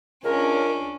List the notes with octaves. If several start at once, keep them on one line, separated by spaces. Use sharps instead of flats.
C#2 C#4 D4 A#4